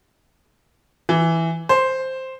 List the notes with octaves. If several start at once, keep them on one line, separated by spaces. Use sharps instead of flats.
E3
C5